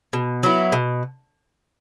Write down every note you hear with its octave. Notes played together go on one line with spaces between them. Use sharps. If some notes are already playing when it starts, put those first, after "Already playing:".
B2
F#3 B3 E4
B2